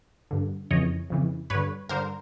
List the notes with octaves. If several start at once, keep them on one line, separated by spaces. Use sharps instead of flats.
G2 D3
F2 C#3 E3 C#5 D#5
F2 C#3 E3
G2 D3 B4 C#5
G2 D3 A#4 C5